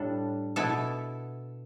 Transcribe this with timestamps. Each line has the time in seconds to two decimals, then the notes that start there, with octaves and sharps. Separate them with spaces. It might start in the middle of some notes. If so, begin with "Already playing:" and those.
Already playing: A2 G3 D4 A4
0.56 B2 B3 E4 A4